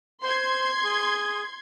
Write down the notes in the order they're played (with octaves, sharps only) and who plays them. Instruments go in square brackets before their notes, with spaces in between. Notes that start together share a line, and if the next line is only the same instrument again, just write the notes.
[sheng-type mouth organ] C5 [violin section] C6 G#6
[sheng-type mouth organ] G#4